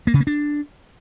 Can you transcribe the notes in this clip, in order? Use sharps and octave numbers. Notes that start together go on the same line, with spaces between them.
A#3
C#3
A#3
D4